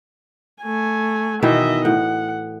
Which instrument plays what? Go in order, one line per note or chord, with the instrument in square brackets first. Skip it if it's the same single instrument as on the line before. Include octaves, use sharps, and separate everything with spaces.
[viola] A3 G#5
[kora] B2 D#3 E3 [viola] D#5 E5
[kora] A2 [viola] F#5